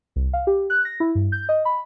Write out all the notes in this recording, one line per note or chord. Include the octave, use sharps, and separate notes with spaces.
C2
F5
G4
F#6
A#6
E4
G2
G6
D#5
B5